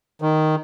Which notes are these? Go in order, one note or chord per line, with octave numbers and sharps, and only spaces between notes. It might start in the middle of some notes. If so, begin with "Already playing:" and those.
D#3